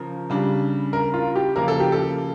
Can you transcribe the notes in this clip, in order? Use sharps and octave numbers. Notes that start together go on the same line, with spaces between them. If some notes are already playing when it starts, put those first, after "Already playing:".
Already playing: C#3 F3 A#4
C#3 G3 D4
A#4
F4
G4
C#3 F3 A#3 A#4
A4
G4
A4